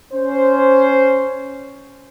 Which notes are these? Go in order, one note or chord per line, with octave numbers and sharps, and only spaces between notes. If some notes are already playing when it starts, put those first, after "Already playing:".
C#4 C5